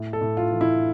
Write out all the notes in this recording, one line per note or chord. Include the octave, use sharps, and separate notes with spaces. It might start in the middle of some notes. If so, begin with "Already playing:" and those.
Already playing: A2
A4
A2
F4
E3
E4